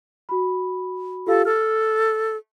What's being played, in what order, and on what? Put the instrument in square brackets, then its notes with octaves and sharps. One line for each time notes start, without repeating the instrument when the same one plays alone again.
[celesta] F#4 B5
[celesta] F4 G4 F5 [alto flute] A4
[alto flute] A4 [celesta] F6